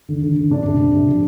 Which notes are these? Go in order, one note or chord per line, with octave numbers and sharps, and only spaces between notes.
D3
D3
D3
C3 D4
C3
C3
C3
F3